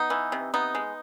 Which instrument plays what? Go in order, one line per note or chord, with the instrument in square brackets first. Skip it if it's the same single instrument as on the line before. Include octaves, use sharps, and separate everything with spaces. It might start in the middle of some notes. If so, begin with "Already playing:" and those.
Already playing: [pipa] B3 D#4
E3
C3
B3 D#4
G#3